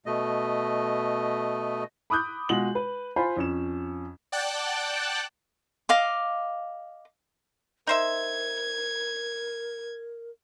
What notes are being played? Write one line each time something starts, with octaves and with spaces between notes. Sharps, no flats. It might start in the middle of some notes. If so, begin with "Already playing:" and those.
B2 A3 D#5
B5 D6 D#6 F#6 G6
B2 G#3 F4 F#4 D#6 F#7
B4
F4 C5 G#5 B5
F2 C#4 E7
D5 F#5 G5 A5 F#6
D#5 F5 D6
D#4 A#4 C5 E5 G#6